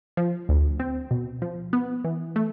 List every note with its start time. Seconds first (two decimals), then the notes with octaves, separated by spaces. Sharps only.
0.17 F3
0.49 D2
0.80 C4
1.11 B2
1.42 F3
1.73 B3
2.04 E3
2.36 A3